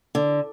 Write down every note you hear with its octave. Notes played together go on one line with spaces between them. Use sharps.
D3